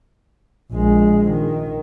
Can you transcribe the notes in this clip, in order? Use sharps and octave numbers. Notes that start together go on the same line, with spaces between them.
A#1 G#3
D#3